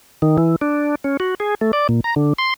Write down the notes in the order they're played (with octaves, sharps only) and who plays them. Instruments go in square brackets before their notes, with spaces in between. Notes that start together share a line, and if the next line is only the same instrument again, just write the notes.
[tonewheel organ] D#3
E3
D4
C#4
F#4
G#4
A3
D5
A#2
A#5
D3
C6